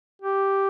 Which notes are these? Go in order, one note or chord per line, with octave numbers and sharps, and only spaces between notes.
G4